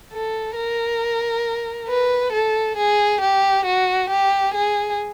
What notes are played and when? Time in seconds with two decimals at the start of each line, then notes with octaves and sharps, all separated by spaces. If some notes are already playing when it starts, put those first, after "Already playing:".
0.12 A4
0.56 A#4
1.88 B4
2.33 A4
2.77 G#4
3.21 G4
3.66 F#4
4.10 G4
4.54 G#4